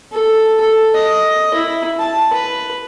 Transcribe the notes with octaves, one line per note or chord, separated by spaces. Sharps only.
A4
A4
D#5
E4
A5
B4